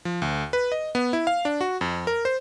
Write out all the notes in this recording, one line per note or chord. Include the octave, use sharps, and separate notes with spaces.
F3
D2
B4
D#5
B3
E4
F5
D4
F#4
F2
A#4
C5